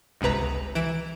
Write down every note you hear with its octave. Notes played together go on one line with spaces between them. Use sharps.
G1 C#2 C3 B4 A#5
E3 D7 E7